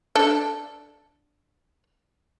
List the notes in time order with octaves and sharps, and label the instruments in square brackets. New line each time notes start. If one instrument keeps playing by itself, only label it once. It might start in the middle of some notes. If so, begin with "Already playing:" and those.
[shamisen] D4 A4